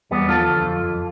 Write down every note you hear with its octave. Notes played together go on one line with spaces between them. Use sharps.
E2 G3 B3
F3 F4 A4
D2
F2
F2